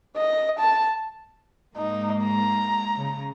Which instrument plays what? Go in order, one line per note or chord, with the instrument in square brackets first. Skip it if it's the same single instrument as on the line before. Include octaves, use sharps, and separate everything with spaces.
[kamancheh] D#5
A5
[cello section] G#2 A#3 [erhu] D#4
[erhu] A#5
[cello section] C#3